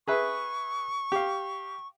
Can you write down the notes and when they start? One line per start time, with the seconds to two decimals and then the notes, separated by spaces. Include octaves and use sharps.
0.08 G#4 B4 E5 C#6
1.12 G4 F5